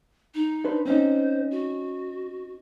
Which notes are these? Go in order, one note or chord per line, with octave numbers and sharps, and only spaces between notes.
D#4
D4 B4 C5
C4 C#4 D#4 C5
F#4